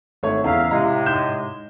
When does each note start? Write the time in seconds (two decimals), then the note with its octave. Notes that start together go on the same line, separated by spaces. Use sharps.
0.23 G#1 A3 C#5
0.44 E2 C#3 A#4 E5 F5
0.71 A2 C3 G#3 F5 A#5
1.06 G#2 G6 E7